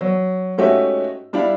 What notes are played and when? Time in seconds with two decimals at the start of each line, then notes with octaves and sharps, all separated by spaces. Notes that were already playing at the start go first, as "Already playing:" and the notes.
0.01 F#3
0.58 G#2 A3 C#4 F#4 G4 E5
1.33 G3 D4 E4 F5